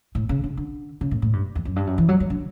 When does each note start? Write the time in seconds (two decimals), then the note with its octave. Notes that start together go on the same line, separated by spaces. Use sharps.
0.15 A2
0.29 C#3
0.44 D3
0.57 D3
1.01 C#3
1.11 A2
1.22 A2
1.33 G2
1.55 E2
1.65 F#2
1.76 G2
1.87 F#2
1.98 E3
2.08 F#3
2.20 F#3
2.30 D3